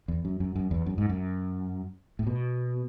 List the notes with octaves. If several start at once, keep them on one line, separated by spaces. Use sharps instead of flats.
E2
F#2
F#2
F#2
E2
F#2
G#2
F#2
A2
B2